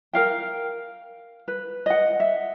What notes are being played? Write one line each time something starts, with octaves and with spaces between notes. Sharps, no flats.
A#4 F5 G5
B4
D#5 F#5
E5